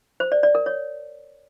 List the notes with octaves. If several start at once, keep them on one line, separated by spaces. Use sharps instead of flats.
C5
D5
D5
A#4
C#5